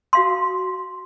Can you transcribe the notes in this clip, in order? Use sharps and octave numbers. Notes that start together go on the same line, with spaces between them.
F#4 F5 C6